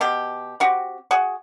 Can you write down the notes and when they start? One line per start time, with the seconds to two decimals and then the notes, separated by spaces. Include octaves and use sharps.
0.01 B2 G4
0.60 C4 F#4 G4
1.11 F#4 G#4